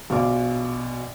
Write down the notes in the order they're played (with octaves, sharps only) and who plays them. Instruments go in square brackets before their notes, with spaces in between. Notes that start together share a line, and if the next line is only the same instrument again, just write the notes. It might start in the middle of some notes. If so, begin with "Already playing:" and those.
[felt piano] A#1 B2 F5 D6